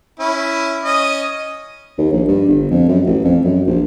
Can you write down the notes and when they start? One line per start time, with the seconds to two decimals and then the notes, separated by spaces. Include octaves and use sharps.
0.20 C#4 E4
0.84 C#4 D#5
1.98 D#2
2.12 A#1
2.28 G2
2.48 G1
2.71 F2
2.88 F#2
3.06 A1
3.24 F2
3.44 F#2
3.67 A#1